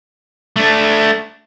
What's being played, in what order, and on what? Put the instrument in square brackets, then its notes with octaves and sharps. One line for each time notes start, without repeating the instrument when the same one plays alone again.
[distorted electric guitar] A3 D4